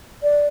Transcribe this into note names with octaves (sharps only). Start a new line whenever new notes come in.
D5